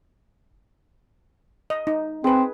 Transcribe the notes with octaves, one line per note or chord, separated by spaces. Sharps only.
D#5
D#4
C4 G#4 B4